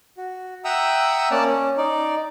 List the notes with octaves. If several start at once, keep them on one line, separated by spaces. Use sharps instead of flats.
F#4
E5 F#5 G5 A#5 D#6 E6
A#3 C#4 D5 A5
C#4
D#4 D5